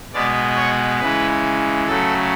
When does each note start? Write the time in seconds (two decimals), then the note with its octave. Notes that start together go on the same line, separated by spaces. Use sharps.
0.13 B2 G#3 B3 D5
0.57 C#5
1.00 C#3 E3 G#3 B4
1.87 C#3 F#3 A3 A4